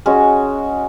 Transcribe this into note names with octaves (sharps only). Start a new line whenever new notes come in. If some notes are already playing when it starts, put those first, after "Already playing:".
G#3 C#4 F#4